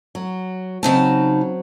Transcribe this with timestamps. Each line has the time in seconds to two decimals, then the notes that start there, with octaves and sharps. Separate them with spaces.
0.15 F#3
0.83 C#3 F#3 C4 D#4 A5